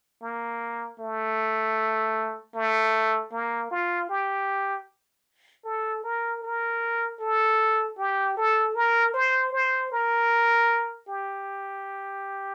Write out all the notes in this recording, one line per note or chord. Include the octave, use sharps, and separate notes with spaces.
A#3
A3
A3
A#3
F4
G4
A4
A#4
A#4
A4
G4
A4
A#4
C5
C5
A#4
G4